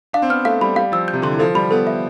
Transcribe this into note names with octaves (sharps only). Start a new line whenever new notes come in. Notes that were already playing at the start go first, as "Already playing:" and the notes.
D4 F5
C4
B3 F6
A3 F5
G3 B5
G3 F5
F3 E6
G6
C3
D3 C6
E3
F3 A4
G3 B5
B3 A4
E5